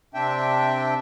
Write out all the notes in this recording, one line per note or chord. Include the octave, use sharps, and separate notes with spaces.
C3 C4 D4 E5 G5